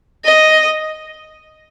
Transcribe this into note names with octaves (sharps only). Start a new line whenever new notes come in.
D#5